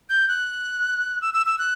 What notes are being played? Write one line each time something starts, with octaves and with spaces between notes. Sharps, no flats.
G6
F#6
E6
E6
E6
F#6